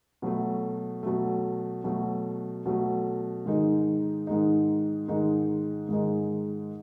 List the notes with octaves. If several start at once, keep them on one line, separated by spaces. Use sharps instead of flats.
B2 F#3 A3
B2 F#3 A3
B2 F#3 A3
B2 F#3 A3
G#2 D#3 G#3 D#4
G#2 D#3 G#3 D#4
G#2 D#3 G#3 D#4
G#2 D#3 G#3 D#4